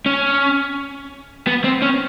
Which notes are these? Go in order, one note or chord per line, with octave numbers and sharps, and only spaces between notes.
C#4
B3
C4
C#4